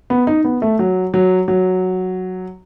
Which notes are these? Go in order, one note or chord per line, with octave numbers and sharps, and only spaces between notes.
B3
D#4
B3
A3
F#3
F#3
F#3